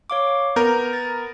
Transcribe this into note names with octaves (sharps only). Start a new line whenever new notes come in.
C#5 F5 D6
B3 A#4 A#5 G6
A6